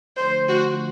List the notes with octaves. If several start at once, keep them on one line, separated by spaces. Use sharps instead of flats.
D3 F3 A3 C5
F#4